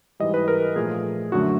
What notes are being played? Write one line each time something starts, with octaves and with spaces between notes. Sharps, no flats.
G#2 E3 G3 D#5
B4
A#4
A#2 F3 A3 G#4
F#2 D3 F#3 A3 F#4